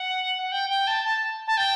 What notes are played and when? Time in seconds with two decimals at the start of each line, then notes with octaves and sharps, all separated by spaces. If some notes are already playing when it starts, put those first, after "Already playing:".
Already playing: F#5
0.42 F#5
0.51 G5
0.69 G5
0.87 A5
1.04 A5
1.47 A5
1.57 G5